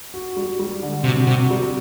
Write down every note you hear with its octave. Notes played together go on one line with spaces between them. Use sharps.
F#4
G3
G3
D3
C3 F#4
C3 F#4
G3